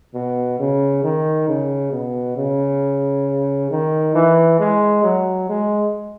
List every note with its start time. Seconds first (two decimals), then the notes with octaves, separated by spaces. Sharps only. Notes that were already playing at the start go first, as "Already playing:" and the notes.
0.14 B2
0.59 C#3
1.04 D#3
1.48 C#3
1.92 B2
2.36 C#3
3.71 D#3
4.15 E3
4.60 G#3
5.03 F#3
5.49 G#3